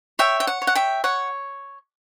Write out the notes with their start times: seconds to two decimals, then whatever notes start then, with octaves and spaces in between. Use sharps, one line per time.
0.19 C#5 E5 G5
0.40 G5
0.47 F#5
0.62 C#5
0.67 F#5
0.75 E5 G5
1.04 C#5 F#5